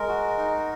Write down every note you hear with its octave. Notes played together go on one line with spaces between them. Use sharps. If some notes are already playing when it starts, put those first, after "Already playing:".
Already playing: G#3 A#4
F#4
D#4